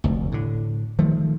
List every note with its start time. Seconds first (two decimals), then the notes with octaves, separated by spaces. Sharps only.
0.04 F1 D2
0.32 A2 D3
0.99 D#3 F3 A3